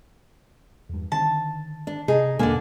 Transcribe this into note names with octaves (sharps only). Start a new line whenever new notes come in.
E2 G2
D3 D#3 C4 A5
D4
C3 D#4 G#4
E2 G#2 B2 D3 A#3 D5 G#5